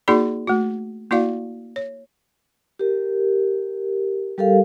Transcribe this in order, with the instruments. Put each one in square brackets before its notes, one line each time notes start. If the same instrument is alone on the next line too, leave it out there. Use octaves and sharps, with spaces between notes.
[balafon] A#3 D#4 F#4 G#4 D5 C6
A3 F#4
A#3 E4 F#4 D5 F5
C#5
[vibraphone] G4 A#4
G3 G4 A4 A#4 F5